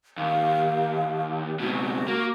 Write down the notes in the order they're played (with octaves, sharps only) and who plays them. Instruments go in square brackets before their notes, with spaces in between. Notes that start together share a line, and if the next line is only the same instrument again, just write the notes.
[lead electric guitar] D#2 [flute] F5
[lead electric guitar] C#2 B2 [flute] F#4
[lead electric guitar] A#3